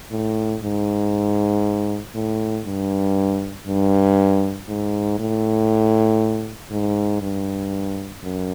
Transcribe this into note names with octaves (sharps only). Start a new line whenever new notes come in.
A2
G#2
A2
G2
G2
G#2
A2
G#2
G2
F#2